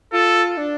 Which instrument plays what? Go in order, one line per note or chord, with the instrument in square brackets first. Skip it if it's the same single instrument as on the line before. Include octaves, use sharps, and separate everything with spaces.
[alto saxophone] F4 [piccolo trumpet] A4
[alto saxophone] D4